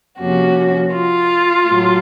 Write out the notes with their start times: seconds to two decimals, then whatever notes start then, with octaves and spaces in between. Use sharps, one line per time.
0.20 F2 C3 F3 A#3 C#4 F#4
0.94 F4
1.68 A2 F#3